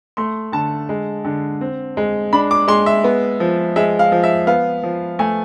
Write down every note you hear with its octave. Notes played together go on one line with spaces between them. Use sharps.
A3 C6
D3 A5
G#3
D3
C4
G#3
D4 B5
D6
G#3 C6
E5
B3
F3
G#3 E5
F5
F3
E5
B3 F5
F3
A3 G#5